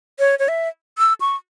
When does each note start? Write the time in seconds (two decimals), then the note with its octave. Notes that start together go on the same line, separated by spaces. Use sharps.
0.19 C#5
0.39 C#5
0.48 E5
0.98 E6
1.20 C#6